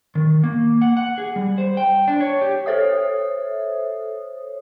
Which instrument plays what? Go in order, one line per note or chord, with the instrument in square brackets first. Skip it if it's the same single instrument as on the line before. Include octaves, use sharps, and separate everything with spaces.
[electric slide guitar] D#3
A#3
F#5
F#5
G#4
G3
C5
G5
D4
C#5
G4
[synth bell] A4 C5 C#5 E5 D#6